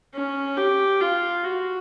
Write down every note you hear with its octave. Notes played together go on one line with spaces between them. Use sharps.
C#4
G4
F4
F#4